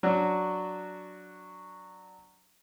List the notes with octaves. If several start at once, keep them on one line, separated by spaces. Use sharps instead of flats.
F#3 D4 F#4